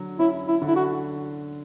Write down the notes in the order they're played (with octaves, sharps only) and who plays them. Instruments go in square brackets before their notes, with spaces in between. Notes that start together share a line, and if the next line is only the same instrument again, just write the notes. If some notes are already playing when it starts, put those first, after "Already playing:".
Already playing: [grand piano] D3 F#3
[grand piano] C#4 [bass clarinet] E4
[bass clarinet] E4
[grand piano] D3
[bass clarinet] E4
F#4